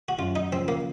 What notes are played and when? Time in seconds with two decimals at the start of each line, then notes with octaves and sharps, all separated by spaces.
0.08 F#4
0.18 F#2 F4
0.36 D#4
0.52 C#3 F3 C4
0.68 A#3